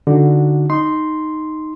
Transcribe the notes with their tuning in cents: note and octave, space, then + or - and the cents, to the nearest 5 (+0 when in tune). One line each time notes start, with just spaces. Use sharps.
D3 +0 D#4 +0 F#4 +0
D#4 +0 C6 +0